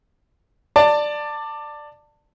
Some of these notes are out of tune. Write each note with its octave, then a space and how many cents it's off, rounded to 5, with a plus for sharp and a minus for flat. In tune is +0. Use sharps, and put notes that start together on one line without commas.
D5 +10 A5 +25